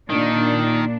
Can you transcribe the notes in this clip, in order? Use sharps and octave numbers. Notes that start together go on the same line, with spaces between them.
A#2 D#3 D4